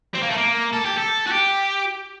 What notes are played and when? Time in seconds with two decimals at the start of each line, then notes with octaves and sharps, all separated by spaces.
0.15 C4
0.23 A#3
0.30 A3
0.37 A#3
0.73 A4
0.85 G4
0.98 A4
1.27 F#4
1.31 G4